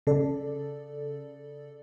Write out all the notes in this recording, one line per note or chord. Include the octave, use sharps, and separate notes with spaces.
C#3 A4 D5